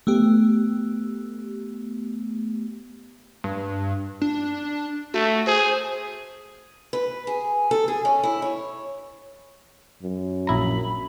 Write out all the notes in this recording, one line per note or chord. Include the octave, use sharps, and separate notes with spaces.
A3 B3 G4
G2
D4
A3 F#4
G#4 C5
B4
G#4
A4
G#4
C#4
E4
C#5
F#2
A#1 E4 A#5 B5